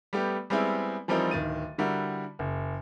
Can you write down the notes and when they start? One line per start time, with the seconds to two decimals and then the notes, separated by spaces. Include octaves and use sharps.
0.13 G3 A3 B3 G4
0.50 G3 G#3 B3 C4 E4
1.08 E3 F3 G3 C4 D#4 A#4
1.31 D1 D#3 A6 D#7
1.78 D3 G3 E4 F#4 A#4
2.39 F#1